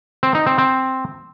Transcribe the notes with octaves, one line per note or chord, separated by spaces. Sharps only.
C4
D#4
C4
C4